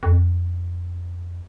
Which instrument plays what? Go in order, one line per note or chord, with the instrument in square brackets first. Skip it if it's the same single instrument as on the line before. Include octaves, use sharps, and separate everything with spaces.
[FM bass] F2